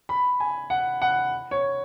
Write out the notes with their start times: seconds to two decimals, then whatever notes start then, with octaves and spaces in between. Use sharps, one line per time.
0.09 B5
0.40 G#5
0.70 F#5
1.02 F#5
1.51 C#5